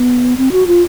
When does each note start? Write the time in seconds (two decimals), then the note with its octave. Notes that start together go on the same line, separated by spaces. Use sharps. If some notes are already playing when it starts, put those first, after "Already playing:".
Already playing: B3
0.37 C4
0.52 F#4
0.67 F4